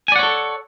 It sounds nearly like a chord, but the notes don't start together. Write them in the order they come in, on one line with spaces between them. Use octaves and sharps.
G#5 D5 F#5 C#5 A4